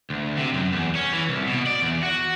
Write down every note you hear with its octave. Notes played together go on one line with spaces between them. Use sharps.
D2
C3
F#2
E2
C#4
E3
C2
B2
D5
E2
F#4